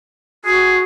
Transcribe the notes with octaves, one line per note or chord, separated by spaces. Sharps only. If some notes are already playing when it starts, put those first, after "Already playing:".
F#4 G#4